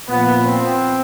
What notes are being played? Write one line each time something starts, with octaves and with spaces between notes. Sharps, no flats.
A#2 F3 B3
C4